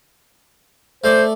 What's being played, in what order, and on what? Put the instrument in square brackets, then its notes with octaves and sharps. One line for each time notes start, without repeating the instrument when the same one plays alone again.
[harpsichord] A3 D5 [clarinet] C5